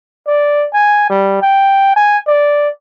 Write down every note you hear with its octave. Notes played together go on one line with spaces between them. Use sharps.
D5
G#5
G3
G5
G#5
D5